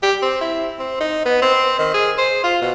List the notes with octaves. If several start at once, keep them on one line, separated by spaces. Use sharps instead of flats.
G4
C4
E4
C4
D#4
B3
C4
D#3
G#4
C5
F4
B2